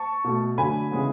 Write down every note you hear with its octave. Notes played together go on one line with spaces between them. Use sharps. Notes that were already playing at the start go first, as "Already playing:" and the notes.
Already playing: A5 C#6
B2 A3
D3 F#3 A3 G#5 B5
C#3 E3 G#3 B3